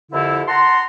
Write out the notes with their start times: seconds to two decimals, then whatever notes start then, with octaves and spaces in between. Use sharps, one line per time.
0.11 C2 F2 D3 E4
0.48 F#5 A5 A#5 C6